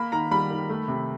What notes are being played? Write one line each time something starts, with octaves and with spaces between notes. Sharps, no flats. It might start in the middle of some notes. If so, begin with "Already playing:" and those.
Already playing: A#3 B5
D#3 A#5
G3 B5
D#3
A3
C3